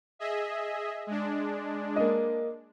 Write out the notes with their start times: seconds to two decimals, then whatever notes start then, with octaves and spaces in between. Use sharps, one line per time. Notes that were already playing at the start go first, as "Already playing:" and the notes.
0.19 G#4 D#5 E5
1.07 G#3 D4
1.96 A#3 D#5